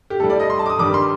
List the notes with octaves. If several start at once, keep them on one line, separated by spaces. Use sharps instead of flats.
G4
A2 G3 A4
D5
D#5
C6
A5
D6
D#6
G2 D#3 G3 D6
C6